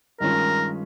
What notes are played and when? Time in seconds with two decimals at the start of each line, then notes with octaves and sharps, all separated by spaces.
0.20 G2 D#3 G#3 C#4 F4 A#4